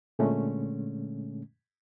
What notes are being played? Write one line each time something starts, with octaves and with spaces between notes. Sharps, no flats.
A#2 D3 G#3 A3 C#4